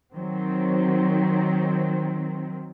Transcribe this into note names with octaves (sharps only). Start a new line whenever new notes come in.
D#3 F#3 C4